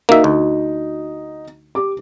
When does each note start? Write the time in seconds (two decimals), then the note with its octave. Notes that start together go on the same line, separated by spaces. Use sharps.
0.09 A#3 D#4 F#4 E5
0.24 D2
1.75 G4 D6